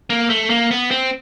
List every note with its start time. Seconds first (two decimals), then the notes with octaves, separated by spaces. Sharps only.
0.10 A#3
0.30 A3
0.50 A#3
0.71 B3
0.91 C4